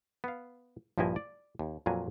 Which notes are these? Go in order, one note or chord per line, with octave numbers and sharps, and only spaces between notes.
B3 F5
A#1 G2 F3 E4 D#5 G#5
D5
D#2
F2 A#2 F#3 G#5